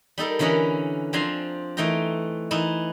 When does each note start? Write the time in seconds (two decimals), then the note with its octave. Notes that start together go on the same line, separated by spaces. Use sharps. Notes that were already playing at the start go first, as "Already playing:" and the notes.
0.18 G3 D#4 A4 A#4
0.39 D3 E3 C#4 A#4 D#5 B5
1.13 F3 C4 D4 G#5 A#5 C6
1.77 E3 A3 D#4 G5 A#5
2.51 E3 D#4 E4